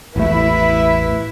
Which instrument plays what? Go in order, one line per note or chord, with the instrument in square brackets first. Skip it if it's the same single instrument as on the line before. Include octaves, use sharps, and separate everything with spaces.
[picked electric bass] A1 E2 A3 [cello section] E4 B4 E5